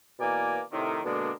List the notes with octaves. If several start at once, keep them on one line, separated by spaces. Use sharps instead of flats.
B2 E3 A#3 A#4 D5 G#5
A2 C3 D#3
B2 D3 G#3 A#3 D4